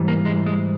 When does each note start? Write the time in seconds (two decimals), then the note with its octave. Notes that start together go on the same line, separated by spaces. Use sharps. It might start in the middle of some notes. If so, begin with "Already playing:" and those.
Already playing: G#2 E3 G3
0.08 A#3
0.25 G#3
0.47 G#3